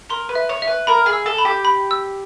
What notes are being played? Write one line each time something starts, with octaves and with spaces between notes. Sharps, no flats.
A#4 C6
B4
E5
C#5
E5
B4
A#4 B5
G#4
E6
A4
B5
G4
B5
E6